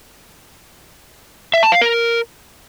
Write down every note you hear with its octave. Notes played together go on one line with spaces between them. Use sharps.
E5
A5
F5
A#4